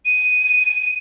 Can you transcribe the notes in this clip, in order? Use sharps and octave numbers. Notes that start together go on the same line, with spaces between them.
D#7